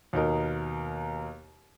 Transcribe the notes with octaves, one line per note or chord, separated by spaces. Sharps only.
D#2 B2 D#4 A#4